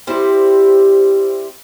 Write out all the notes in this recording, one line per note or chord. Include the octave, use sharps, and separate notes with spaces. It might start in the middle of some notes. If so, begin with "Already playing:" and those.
G3 C4 E4 G4